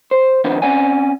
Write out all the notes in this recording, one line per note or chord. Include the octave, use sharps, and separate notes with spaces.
C5
D#3 F3 B3 C4 D4 D#4
C4 C#4 D5 F#5 G#5